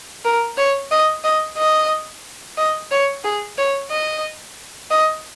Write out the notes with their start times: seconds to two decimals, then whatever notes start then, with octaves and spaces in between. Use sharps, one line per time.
0.25 A#4
0.57 C#5
0.91 D#5
1.24 D#5
1.58 D#5
2.57 D#5
2.91 C#5
3.24 G#4
3.58 C#5
3.91 D#5
4.91 D#5